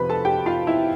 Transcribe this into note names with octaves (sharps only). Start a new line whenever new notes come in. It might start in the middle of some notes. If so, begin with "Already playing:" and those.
Already playing: F2 C3 F3 B4 B5
A4 A5
G4 G5
F4 F5
E4 E5